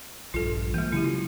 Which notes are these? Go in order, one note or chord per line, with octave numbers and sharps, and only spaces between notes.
A#1 G2 F4 A4
E3 G#3 A#3
C#3 F#3 E4 G4
F4